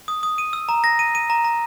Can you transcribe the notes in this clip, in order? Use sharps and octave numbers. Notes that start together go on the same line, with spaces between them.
D#6
D#6
D#7
E6
A#5
A#6
D#7
D#7
A#5
A#5